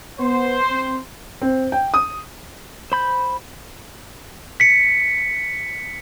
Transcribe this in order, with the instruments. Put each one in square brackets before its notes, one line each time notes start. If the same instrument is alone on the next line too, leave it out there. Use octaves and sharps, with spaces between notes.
[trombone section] B3 [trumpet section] C5
[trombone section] C4
[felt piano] C4
G5
D#6
[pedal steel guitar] C5 B5 G6
[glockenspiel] B6 C#7